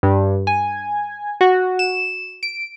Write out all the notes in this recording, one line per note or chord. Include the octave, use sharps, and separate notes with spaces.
G2
G#5
F#4
E7
D7